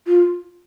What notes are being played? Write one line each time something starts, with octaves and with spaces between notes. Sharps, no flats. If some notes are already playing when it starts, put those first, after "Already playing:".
F4